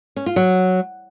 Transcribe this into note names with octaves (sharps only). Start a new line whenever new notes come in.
C#4
F4
F#3